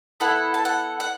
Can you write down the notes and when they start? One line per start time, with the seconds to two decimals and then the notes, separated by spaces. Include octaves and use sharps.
0.20 B3 E4 A4 F#5
0.54 A5
0.65 F#5
1.00 F#5